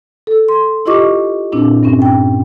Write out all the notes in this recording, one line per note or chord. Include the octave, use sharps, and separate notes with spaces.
A4
C6
E4 F4 G4 D#5 C#6 D6
A#2 C4 D4 E4
G2 C4 C#4
G5